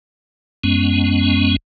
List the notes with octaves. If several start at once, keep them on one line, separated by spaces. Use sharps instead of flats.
F#2 G#3 B3 C#4